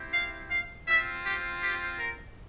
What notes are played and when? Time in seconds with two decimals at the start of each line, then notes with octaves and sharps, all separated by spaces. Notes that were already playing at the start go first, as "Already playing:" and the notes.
Already playing: C4 E4 G4
0.14 F5
0.51 F5
0.88 C4 F4 E5
1.25 G4
1.63 G4
1.99 A#4